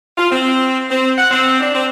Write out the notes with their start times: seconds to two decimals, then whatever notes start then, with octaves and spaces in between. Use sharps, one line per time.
0.18 F4
0.31 C4
0.91 C4
1.18 F#5
1.31 C4
1.60 D4
1.75 C4